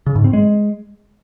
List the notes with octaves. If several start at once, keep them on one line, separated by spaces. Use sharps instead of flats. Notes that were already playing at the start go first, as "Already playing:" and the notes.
C#3
G#2
C4
G#3